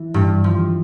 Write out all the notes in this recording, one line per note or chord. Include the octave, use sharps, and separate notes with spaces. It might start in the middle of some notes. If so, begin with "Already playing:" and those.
Already playing: E3
G2
F3